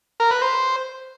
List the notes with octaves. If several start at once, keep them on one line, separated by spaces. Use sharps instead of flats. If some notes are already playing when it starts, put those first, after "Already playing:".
A#4
B4
C5